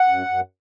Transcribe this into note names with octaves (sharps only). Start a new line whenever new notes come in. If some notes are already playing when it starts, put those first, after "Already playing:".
Already playing: F#5
F#2
F#2